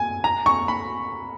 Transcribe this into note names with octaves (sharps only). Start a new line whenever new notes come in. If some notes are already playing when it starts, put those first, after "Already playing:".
Already playing: G#5
A#5
C#6
B5